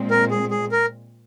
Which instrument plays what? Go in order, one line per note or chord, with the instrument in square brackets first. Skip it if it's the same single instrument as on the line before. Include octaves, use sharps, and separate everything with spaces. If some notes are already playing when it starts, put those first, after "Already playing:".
Already playing: [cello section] A#2 G#3 C4
[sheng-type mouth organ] A#4
G#4
G#4
A#4